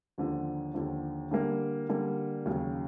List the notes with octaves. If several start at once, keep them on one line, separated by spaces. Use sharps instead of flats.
D#2 D3 F3
D#2 D3 F3
D3 G3 A#3
D3 G3 A#3
D#2 C#3 F#3